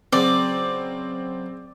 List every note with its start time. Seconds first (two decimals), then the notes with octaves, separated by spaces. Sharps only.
0.12 C#3 F#3 C4 B4 D5